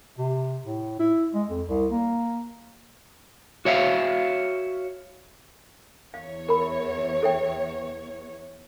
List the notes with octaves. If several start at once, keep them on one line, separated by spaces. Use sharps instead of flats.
C3
A2
E4
G#3
F2
C2
A#3
F#4 C#5 E5 F5
E2 C#5 F5
A#4 B5
A4 E5 G5